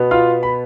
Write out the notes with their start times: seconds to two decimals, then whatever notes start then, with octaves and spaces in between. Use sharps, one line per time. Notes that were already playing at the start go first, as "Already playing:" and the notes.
Already playing: B2 B3
0.11 F4 F5
0.43 B5